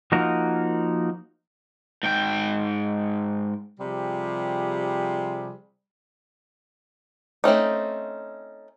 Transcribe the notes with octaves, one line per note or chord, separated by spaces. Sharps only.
F3 A#3 D#4 F#4 A#4
G#2 G5
C3 F3 G3 G#4
A3 C4 C#4 D#4